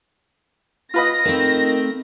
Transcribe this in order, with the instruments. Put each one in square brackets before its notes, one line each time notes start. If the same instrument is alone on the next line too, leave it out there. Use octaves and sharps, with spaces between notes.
[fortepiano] F4 B4 D#5 [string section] A#6
[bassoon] D#3 [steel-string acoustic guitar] A3 C4